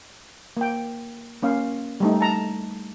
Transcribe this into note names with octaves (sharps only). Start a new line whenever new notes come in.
A#3 G5
A#3 C#4 F5
G3 A3 D#4
A5 A#5